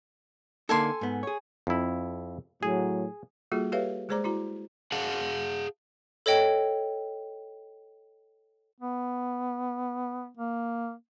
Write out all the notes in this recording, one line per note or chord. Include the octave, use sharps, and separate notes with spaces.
D3 A#3 D#4 A4 G#5 C6
G#2 B3
G#4 C#5
F2 E4
A2 F#3 G#4
G3 A#3 F4 F#4 G#4 A4
G4 A4 B4 C#5 E5 F5
G#3 G#4 C5 D5 A#5 D6
E4 F#4 A#5
G#4 F5 F#5 A5
A4 C#5 D#5 G5
B3
A#3